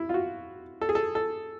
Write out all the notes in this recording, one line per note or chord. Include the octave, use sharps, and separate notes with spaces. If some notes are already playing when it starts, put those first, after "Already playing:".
Already playing: E4
F4
F#4
A4
G#4
A4
A4